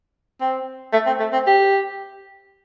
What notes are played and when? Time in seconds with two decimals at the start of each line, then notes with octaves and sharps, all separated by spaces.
0.41 C4
0.93 A3
1.06 C4
1.20 A3
1.32 C4
1.47 G4